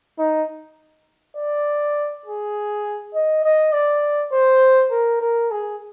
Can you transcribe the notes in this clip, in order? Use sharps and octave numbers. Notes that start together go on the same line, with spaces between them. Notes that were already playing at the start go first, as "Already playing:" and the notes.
D#4
D5
G#4
D#5
D#5
D5
C5
A#4
A#4
G#4